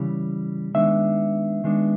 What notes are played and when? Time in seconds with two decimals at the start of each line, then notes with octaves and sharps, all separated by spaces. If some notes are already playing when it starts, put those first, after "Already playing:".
Already playing: C#3 E3 G3
0.74 D#3 G#3 B3 D4 E5
1.64 D#3 G#3 B3 D4